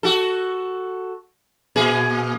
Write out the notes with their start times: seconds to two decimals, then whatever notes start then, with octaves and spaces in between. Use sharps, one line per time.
0.03 F#4 A4
1.76 A#2 G#4